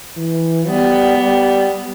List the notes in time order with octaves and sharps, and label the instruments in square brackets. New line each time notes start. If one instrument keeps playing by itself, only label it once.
[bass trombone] E3
[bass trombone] G3 [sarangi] B3
[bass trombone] G3